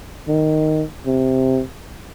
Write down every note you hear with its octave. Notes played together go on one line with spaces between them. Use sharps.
D#3
C3